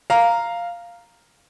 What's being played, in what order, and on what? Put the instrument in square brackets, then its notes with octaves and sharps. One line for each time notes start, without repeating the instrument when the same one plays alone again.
[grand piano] F5 A#5